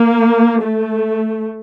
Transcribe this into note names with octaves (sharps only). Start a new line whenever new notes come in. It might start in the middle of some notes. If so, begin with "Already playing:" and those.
Already playing: A#3
A3